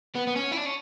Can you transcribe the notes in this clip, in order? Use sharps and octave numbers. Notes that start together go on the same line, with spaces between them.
B3
B3
C#4
E4
D4
C#4